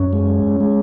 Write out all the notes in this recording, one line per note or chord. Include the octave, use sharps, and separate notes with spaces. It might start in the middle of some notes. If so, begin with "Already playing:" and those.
Already playing: F#2 C#4
G#3
G#3